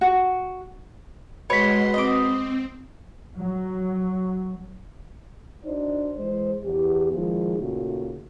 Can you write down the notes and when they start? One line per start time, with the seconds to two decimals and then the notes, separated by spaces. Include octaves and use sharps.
0.01 F#4
1.50 B2 G#3 C#5 F#5 B5 C6 B6
1.94 C4 D#5 D6
3.39 F#3
5.65 D4 D#4 F#4 C5 D5
6.17 E3 G#3 C5
6.64 E2 G4
7.12 D#3 F3 G#3 E4 G#4
7.58 A#2 C#3 A3 D#4 F#4